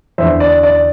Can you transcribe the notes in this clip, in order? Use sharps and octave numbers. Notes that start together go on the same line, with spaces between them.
E2 D3 C5 E5
D5
D5